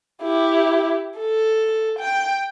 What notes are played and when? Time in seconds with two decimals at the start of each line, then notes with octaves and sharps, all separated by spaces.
0.23 E4 G4
1.18 A4
1.99 G5